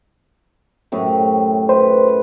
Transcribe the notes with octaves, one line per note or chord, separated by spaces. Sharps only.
F#2 A2 C3
B4 C5